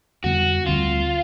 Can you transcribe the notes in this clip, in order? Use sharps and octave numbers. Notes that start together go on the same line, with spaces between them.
F2 D3 G3 B3 F#4
D2 D3 G3 C4 F4